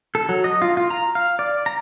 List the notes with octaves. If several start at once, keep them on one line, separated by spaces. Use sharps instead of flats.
A4
F#3
D#5
F4
F4
A#5
F5
D5
A#5